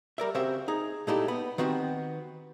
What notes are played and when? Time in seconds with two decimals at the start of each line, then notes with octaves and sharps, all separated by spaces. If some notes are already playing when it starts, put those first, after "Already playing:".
0.18 G3 A#4 D5 E5
0.35 C#3 C4 F#4 G4 C5 E5
0.68 D#4 G#4
1.07 A#2 G#3 A3 D#4 E4 G4
1.28 B3 B5
1.58 D#3 B3 C4 F#4 G4